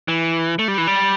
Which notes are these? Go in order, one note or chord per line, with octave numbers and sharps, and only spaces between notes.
E3
A3
G3
E3
G3